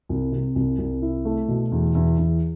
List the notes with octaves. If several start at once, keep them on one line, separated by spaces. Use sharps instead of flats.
C2
C3
C2
C2
E4
A3
B2
E2
E2
E2